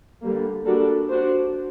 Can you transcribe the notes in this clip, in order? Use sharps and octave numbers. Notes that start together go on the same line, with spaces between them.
D3 G3 A#3
G3 A#3 D4 F#4 A4
D4 F#4 C5